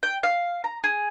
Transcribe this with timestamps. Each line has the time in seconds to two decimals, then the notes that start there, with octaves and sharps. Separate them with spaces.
0.03 G5
0.23 F5
0.64 A#5
0.84 G#4